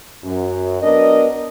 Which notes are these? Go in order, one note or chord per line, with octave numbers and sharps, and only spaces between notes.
F#2
F#3 B3 D4 A#4 D#5